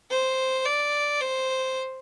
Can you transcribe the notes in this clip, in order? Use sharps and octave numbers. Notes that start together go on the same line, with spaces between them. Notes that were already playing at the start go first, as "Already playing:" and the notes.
C5
D5
C5